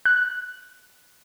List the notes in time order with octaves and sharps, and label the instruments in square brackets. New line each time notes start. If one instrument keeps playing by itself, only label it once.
[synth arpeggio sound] F#6